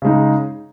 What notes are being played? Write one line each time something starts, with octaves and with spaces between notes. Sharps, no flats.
C#3 G#3 D#4